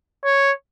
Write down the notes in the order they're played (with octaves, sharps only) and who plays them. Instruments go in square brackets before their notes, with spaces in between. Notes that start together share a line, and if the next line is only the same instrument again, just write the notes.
[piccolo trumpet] C#5